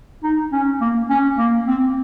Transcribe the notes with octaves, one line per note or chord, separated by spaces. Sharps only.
D#4
C#4
A#3
C#4
A#3
C4